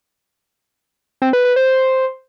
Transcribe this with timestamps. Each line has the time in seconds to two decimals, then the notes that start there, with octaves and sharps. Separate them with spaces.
1.22 C4
1.33 B4
1.45 B4
1.56 C5